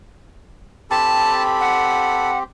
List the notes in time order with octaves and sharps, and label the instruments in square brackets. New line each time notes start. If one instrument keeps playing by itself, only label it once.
[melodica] C4 G4 [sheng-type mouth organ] A4 B5 [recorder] A5
[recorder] F#5